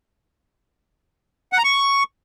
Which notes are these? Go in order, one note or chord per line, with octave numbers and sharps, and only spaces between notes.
F#5
A#5
C#6